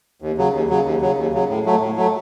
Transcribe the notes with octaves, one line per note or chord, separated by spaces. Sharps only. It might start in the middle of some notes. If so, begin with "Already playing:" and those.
D#2
C#3 F#3
D#2
C#3 F#3
D#2
C#3 F#3
D#2
C#3 F#3
A2
F#3 A3
A2
F#3 A3